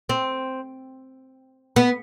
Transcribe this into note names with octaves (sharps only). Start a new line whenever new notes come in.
C4
B3